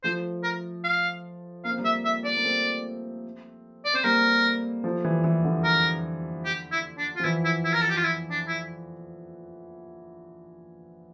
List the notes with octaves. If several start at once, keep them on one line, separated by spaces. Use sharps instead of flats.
F3 A3 C5
A#4
F5
A#3 F5
C4
G3 A#3
E5
E5
D5
A#3
A3 C4
D5
C4 C5
G3 A#3 A#4
F3 A3
E3 G3
E3
D3
A#4
G4
E4
D4
F4
F3
E3 E4
E4
E4
A#4
A4
G4
F4
E4
D4
E4